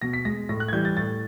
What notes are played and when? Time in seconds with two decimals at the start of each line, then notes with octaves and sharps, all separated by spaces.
0.01 B2 A#6
0.13 B6
0.25 G#3 A#6
0.49 A2 A#6
0.60 F#6
0.68 G#6
0.72 E3 G3 G6
0.85 A6
0.97 A2 A6